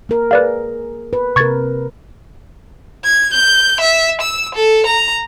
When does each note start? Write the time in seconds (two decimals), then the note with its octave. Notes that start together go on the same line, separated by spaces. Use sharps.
0.09 A#3 A#4
0.31 G#4 B4 D5 F5
1.13 B4
1.36 C3 A#4 C#6 G#6 A6
3.05 G#6
3.34 G6
3.81 E5
4.22 E6
4.55 A4
4.86 A#5